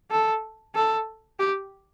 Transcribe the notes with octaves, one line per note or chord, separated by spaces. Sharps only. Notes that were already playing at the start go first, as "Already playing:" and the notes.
A4
A4
G4